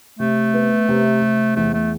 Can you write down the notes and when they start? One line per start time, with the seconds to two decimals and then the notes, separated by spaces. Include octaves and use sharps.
0.19 C3 A3
0.54 B3
0.89 C3
1.22 C3
1.56 E2 A3
1.74 A3